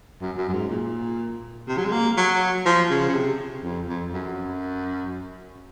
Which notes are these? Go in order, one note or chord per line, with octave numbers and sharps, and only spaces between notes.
F#2
F#2
F#2
G#2
A#2
C3
F#3
G#3
A#3
F#3
F3
C#3
C#3
C3
F2
F2
F#2